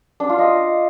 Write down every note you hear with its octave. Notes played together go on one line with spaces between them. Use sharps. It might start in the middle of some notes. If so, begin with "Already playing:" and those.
D4
F4
D#5